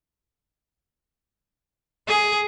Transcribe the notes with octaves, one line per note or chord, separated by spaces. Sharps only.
G#4